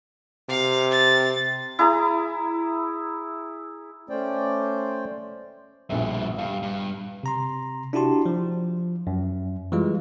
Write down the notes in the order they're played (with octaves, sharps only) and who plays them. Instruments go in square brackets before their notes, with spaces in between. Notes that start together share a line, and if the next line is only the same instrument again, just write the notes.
[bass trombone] C3 [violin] F5
[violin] A6
[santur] E4 G#4 A#5
[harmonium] A3 C#4 C5 D5 G5
[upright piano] A#1 E5 [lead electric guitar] G2 B2
[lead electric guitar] G2 [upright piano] F5
[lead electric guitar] G2
[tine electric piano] C3 A#5 C6
D4 E4 F#4 G4 A5 C6
F3
F#2
E3 G3 G#3 F4